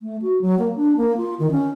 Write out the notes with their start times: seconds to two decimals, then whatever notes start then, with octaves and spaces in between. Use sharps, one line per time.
0.02 A3
0.22 F#4
0.41 F#3
0.59 A#3
0.76 D4
0.97 A#3
1.17 F4
1.39 D#3
1.51 C#4